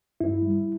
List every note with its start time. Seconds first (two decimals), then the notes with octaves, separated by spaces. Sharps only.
0.21 G2 E4
0.42 G3